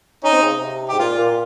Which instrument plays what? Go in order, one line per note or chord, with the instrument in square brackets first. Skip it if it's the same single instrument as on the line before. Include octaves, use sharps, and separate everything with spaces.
[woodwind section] C#4 [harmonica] D#4
[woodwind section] C4
C#3
C3
[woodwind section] G#2 [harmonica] G4
[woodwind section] A#2 [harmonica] F4
[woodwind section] A#2